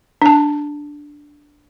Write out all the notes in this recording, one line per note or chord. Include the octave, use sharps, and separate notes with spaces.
D4 A5